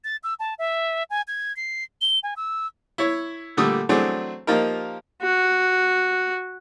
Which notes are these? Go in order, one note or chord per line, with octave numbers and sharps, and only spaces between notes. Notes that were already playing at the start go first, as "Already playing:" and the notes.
A6
E6
A5
E5
G#5
G#6
C7
G7
G#5
E6
E4 C#5
A#2 D3 G3 A3 D#6 E6
E3 F#3 A3 C4 D4 G#4
F3 A#3 D#4 F4 G4 A#4
F#4